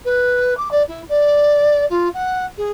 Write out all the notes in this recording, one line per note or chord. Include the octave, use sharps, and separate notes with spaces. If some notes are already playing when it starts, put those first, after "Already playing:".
B4
D6
D5
E4
D5
F4
F#5
G#4